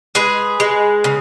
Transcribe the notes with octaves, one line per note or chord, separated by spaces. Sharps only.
G#3 G#4 B4
G#3
C#3